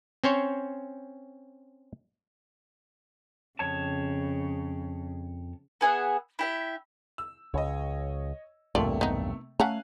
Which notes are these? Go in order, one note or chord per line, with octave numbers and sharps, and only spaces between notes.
C4 C#4 C5 C#5
F2 C#3 C#5 A5
B3 G#4 E5 F#5
E4 G4 E5
E6
C#2 C#5 D#5
B1 E2 G2 C3 A3 A#3 F4 D5
B3 D#4
A3 C#4 F5 F#5 G#5 A#5 F#6